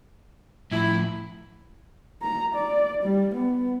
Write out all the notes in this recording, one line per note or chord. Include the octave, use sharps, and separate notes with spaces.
A2 F3 E4
A#5
D5
G3
B3